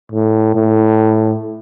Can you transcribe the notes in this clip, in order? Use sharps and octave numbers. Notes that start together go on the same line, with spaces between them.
A2
A2